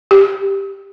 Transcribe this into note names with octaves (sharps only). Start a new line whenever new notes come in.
G4